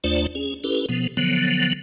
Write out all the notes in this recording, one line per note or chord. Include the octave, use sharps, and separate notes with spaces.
D#2 A3 D4 F4 C5 D5
C#4 G#4
C#4 E4 G4 A4 B4
B2 F3 B3
D3 F3 F#3 B3